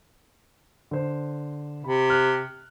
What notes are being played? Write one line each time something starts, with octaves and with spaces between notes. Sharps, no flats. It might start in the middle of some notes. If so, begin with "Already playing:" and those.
D3 C5
C3 B5
F6 F#6